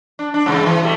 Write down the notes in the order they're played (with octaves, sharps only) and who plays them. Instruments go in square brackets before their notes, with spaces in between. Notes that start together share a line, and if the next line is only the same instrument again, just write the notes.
[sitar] D4
D4
G2 C#3 E3
E3
B2 G3 A3